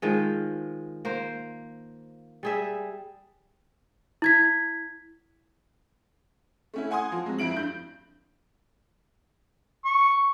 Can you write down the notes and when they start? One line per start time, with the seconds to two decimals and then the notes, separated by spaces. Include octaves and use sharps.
0.02 D#3 F3 G#3
1.05 A#3 C5
2.43 G3 G#4 E5
4.22 E4 G#6 B6
6.74 A3 C#4 E4
6.91 F#5 G#5 C6 D#6
7.12 F3
7.26 F#3 G#3 C4
7.38 F2 E4 D7 F#7
7.57 G2 G6
9.84 C#6